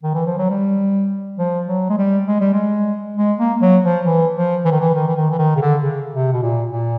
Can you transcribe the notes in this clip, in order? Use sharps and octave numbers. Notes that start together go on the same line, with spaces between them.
D#3
E3
F3
F#3
G3
F3
F#3
G#3
G3
G#3
G3
G#3
G#3
A#3
F#3
F3
E3
F3
E3
D#3
E3
D#3
E3
D#3
E3
D#3
C#3
D3
C#3
C3
B2
A#2
A#2